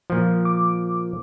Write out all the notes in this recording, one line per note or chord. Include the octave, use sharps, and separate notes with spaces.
A#2 F3
D6